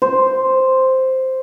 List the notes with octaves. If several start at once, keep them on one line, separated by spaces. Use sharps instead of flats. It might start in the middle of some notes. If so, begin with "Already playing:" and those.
C5